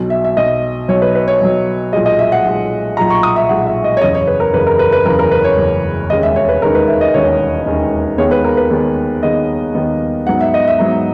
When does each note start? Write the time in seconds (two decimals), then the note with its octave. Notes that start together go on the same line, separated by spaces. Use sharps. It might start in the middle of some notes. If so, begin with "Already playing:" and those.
Already playing: B1 B2 F#3
0.10 E5
0.25 E5
0.37 B1 B2 F#3 D#5
0.88 B1 B2 F#3 C#5
1.02 B4
1.15 B4
1.28 C#5
1.41 B1 B2 F#3
1.93 B1 A#2 G#3 D#5
2.06 D#5
2.19 E5
2.32 F#5
2.45 B1 A#2 G#3
2.97 B1 A#2 G#3 A#5
3.10 C#6
3.23 D#6
3.36 E5
3.49 B1 A#2 G#3 F#5
3.67 E5
3.84 D#5
3.97 C#5
4.01 F#1 E2 C#3 D#5
4.15 C#5
4.27 B4
4.40 A#4
4.53 F#1 E2 C#3 B4
4.67 A#4
4.79 B4
4.92 B4
5.05 F#1 E2 C#3 A#4
5.19 A#4
5.31 B4
5.44 C#5
5.58 F#1 E2 C#3
6.10 E1 D#2 D#3 G#3 C#4 D#5
6.23 E5
6.36 C#5
6.49 B4
6.62 E1 D#2 D#3 G#3 C#4 A#4
6.75 B4
6.88 E5
7.01 D#5
7.14 E1 D#2 D#3 G#3 C#4 C#5
7.66 E1 D#2 D#3 G#3 C#4
8.18 D#2 D#3 G#3 B3 C#5
8.31 B4
8.44 A#4
8.57 B4
8.70 D#2 D#3 G#3 B3
9.23 D#2 D#3 G#3 B3 D#5
9.75 D#2 D#3 G#3 B3
10.26 G#2 F#3 B3 D#4 F#5
10.41 E5
10.54 D#5
10.68 E5
10.79 G#2 F#3 B3 D#4